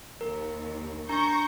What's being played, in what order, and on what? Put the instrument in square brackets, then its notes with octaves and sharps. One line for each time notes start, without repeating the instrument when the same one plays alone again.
[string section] D#2 [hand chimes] A#4
[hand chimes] D4 A#5 [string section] C#6 G6 A#6